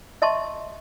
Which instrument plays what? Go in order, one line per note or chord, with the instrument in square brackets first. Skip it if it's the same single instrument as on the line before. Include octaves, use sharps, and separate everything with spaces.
[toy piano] D#5 E5 A5 C6 C#6